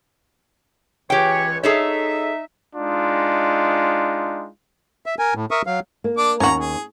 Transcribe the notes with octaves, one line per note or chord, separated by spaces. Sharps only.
C#2 E3 G4 C#5 G5
D#4 G#4 A4 C#5 E5
G#3 D4 D#4 F4
E5
A#4 G#5
A2
A#4 E5 C#6 D#6
F#3 F5
A#3
D4 D6
D#2 G#2 C#4 F#4 A#5
G#4